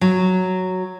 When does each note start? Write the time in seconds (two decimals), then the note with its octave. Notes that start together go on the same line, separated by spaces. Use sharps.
0.01 F#3